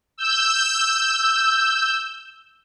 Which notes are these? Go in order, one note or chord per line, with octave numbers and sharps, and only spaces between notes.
E6 G6